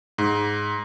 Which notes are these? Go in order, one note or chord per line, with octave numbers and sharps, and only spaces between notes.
G#2